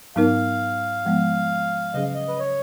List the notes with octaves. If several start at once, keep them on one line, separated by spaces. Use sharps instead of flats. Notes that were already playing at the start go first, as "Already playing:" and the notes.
G#2 F#3 B3 D#4 A#4 F5
G#2 F3 G#3 B3
C#3 F#3 C#4 G#4 D#5
F5
D#5
B4
C#5